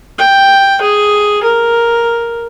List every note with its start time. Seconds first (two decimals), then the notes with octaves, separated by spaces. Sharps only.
0.18 G5
0.81 G#4
1.43 A#4